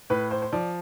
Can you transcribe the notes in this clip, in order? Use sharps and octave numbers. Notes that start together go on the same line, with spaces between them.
A2 B4
C5
C5
F3 D5